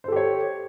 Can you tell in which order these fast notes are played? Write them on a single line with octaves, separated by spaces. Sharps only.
C5 A4 G4 C#5